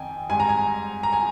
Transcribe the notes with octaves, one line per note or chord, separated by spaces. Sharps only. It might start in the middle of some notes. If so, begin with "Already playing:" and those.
Already playing: F2 D#3 G5 G#5
G#2 G3 G#5
A#5
G#5
A#5
G#5